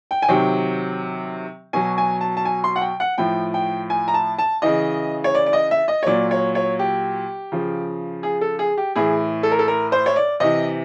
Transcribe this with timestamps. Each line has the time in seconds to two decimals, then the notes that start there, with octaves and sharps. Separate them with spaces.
0.11 G5
0.22 G#5
0.28 C3 D#3 F#3 G5
1.73 B2 F#3 G#5
1.98 G#5
2.21 A5
2.37 A5
2.45 G#5
2.64 C6
2.76 F#5
2.81 G5
3.00 F#5
3.18 A2 F3 G5
3.54 G5
3.90 G#5
4.08 A#5
4.14 A5
4.39 A5
4.62 C#3 E3 D#5
5.24 C#5
5.35 D5
5.46 D5
5.53 D#5
5.71 E5
5.88 D#5
6.03 C#5
6.06 A#2 F#3 D5
6.31 C#5
6.55 C#5
6.79 G4
7.52 C#3 F3
8.23 G#4
8.41 A4
8.59 G#4
8.78 G4
8.96 A2 E3 G#4
9.43 A4
9.51 A#4
9.59 A4
9.68 A#4
9.92 C5
10.06 C#5
10.16 D5
10.40 C3 E3 D#5